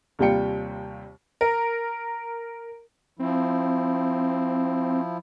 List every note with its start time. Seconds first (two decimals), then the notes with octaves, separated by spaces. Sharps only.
0.19 D#2 C3 G3 F4 G5 C#7
1.41 A#4
3.19 F3 C4 E4